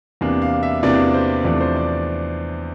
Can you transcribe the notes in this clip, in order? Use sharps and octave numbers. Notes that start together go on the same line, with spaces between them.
E2 C3 E3 A#3 D4 F5
F5
E5
E2 C3 E3 A#3 D4 D5
C5
E2 C3 F3 A3 D4 D5
C5
D5